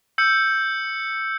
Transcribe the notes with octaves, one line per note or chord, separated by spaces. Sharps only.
E6 G6 C#7